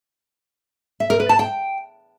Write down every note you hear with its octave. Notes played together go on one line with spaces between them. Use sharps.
E5
A#4
B4
A5
G5